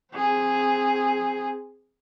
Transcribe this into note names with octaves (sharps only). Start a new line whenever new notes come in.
C4 G#4